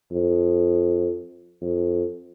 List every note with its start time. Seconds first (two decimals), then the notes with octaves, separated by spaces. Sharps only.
0.11 F2
1.61 F2